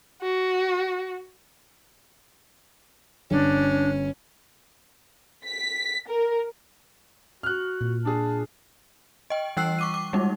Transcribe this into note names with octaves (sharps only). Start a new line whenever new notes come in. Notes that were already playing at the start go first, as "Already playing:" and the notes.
F#4
G1 C#4 D4
B6
A#4
F#4 F6 F#6
A#2
D4 G#4 A5
D#5 G5
E3 G3 G5 E6 F#6 C7
C#6 D6 D#7
D6
G3 G#3 A#3 D#4